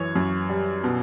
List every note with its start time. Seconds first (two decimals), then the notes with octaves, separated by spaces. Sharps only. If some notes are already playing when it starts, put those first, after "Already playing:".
Already playing: F#2 E3 C#5
0.15 F#2
0.49 G3
0.84 B2